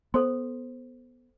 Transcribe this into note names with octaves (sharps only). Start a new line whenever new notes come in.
B3 A4 C5 C6